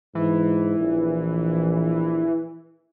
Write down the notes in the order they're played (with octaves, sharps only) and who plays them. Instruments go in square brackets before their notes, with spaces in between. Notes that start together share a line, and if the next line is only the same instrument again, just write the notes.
[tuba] G#2 [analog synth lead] E3
[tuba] A#1